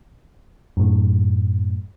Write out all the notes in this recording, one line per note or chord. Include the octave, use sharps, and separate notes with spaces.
F#2 A2